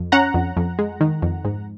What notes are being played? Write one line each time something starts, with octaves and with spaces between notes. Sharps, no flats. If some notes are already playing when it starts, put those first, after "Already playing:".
Already playing: F2
C#4 F#5 A#5
F2
F2
G#3
D#3
F2
G#2